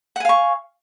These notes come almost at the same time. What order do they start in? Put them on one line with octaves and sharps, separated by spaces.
F#5 G#5 F5 C#6